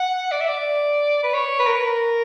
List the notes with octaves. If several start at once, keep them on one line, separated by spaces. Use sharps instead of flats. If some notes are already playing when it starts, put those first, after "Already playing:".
Already playing: F#5
D5
E5
D5
B4
C#5
B4
A#4
B4
A#4